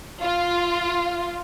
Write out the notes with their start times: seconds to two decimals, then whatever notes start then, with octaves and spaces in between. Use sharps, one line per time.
0.21 F4